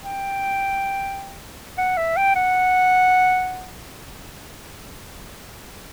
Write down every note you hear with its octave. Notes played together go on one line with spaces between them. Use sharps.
G5
F#5
E5
G5
F#5